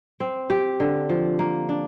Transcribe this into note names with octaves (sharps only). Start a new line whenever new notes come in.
C4
G4
D3
F3
A#3
D4